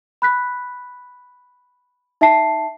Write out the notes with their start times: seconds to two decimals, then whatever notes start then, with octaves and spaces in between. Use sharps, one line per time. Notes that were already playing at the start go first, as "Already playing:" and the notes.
0.22 B5 F#6 B6
2.21 D#4 E5 G5 A5 C7